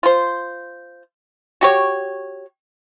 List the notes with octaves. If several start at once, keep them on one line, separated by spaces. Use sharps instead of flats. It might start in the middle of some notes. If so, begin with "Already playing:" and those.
F4 C5
F#4 G4 C#5